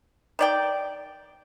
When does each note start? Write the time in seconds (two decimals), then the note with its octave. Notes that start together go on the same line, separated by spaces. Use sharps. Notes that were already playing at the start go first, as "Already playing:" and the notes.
0.39 D#3 D5 G5